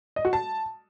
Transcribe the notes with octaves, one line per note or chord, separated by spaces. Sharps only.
D#5
F#4
A5